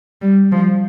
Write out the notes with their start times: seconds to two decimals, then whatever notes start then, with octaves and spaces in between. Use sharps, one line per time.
0.22 G3
0.52 F3